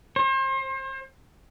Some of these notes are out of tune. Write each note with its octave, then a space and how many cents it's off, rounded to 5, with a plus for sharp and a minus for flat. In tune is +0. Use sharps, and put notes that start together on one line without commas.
C5 +35